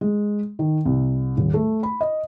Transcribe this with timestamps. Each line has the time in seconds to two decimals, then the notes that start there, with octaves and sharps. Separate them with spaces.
0.01 G#3
0.59 D#3
0.85 C2
1.37 D#1
1.54 A3
1.83 B5
2.01 D#5